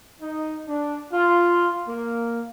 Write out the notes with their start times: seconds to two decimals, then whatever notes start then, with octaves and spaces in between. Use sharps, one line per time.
0.22 D#4
0.69 D4
1.12 F4
1.88 A#3